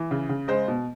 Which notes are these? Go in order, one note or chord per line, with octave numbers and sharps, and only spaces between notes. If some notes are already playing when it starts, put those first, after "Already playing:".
Already playing: E3
C#3
C#3
G#3 C5
B2